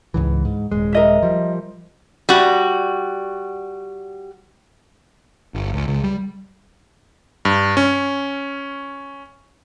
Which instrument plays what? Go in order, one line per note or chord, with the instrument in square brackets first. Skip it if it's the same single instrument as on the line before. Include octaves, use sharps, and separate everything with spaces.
[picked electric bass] C#2 G#2 E3
G#2
D#1 G#3
[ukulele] A#4 D#5 E5
[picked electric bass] F3 G3
[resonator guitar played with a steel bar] G3 F#4
[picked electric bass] G1
C#2
C#2
G3
[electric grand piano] G2
C#4